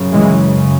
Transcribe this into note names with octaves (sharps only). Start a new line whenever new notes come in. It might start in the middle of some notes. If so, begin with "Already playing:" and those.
Already playing: F#2 C#3
E3 G#3